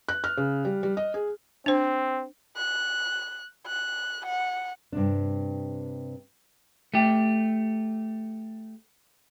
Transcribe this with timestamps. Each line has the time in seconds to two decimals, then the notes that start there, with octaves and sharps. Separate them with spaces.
0.09 F#6
0.24 F6
0.37 C#3
0.65 G3
0.83 G3
0.97 D#5
1.14 G#4
1.66 C4 D4 C5
2.57 F#6
3.67 F#6
4.26 F#5
4.92 G2 C3 D4
6.94 A3 G4